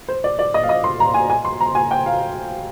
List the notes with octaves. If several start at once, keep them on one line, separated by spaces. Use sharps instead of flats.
C5
D5
D5
D#5
F5
D#5
C6
A#5
G#5
G#5
C6
A#5
G#5
G5
F5